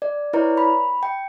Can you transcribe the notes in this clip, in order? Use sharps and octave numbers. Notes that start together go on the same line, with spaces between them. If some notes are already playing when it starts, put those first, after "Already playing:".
D5
E4 B4 C#5 D5 A#5
B5
G5